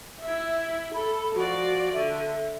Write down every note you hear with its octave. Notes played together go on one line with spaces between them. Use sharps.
E4 E5
A4 B5
F3 F#4 D5
D3 E5